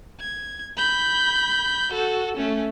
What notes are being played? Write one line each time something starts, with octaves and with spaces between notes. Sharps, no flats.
G#6
B5 G6
F#4 A4
A3 C#4